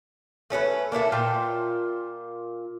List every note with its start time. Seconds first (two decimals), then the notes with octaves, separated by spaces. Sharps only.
0.50 A3 C#4 G#4 B4
0.92 A#3 D4 E4 A4
1.12 A#2 F4 G5